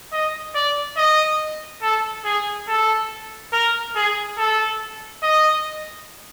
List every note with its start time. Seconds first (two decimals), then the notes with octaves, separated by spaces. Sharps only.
0.12 D#5
0.55 D5
0.98 D#5
1.82 A4
2.25 G#4
2.68 A4
3.53 A#4
3.96 G#4
4.38 A4
5.23 D#5